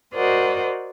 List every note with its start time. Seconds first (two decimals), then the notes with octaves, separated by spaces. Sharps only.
0.14 F#4 A#4 C5 D5 D#5 F#5